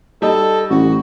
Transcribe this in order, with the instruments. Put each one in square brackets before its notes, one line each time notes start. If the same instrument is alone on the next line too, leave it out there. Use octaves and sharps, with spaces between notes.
[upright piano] G3 D#4 D#5 [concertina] A4
[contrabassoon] A1 [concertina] F#4